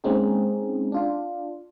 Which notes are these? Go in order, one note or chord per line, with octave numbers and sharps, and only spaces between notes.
G#3 A#3 C4 C#4 D#4 G#4
D4 F4